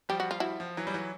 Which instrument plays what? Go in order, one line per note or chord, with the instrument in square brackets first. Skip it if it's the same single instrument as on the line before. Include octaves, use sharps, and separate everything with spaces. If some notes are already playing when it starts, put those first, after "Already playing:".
[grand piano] F3 G3 [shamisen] G4
[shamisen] F#4
F4
E4 F#4
[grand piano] F3
E3 F#3
G3
E3 F#3